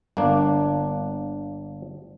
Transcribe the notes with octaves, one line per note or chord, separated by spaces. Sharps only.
G1 A#3 D4